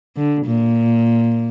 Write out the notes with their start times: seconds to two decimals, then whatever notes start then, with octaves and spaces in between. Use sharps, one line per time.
0.16 D3
0.46 A#2